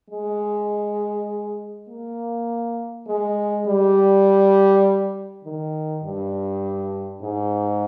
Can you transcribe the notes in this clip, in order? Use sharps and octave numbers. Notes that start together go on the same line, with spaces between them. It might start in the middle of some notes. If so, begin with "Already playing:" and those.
G#3
A#3
G#3
G3
D#3
G2
G#2